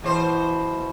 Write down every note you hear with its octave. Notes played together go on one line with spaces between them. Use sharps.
B2 E3 C5